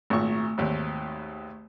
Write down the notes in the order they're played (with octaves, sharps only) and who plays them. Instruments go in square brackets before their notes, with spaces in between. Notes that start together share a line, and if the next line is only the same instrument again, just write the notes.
[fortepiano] G#1 A#2 C#6 [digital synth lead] A3
[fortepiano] G#1 D#2